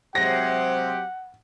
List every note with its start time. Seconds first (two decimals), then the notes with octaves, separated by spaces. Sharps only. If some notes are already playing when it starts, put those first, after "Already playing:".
0.15 C3 F#3 G#3 C4 G4 F#5 A#6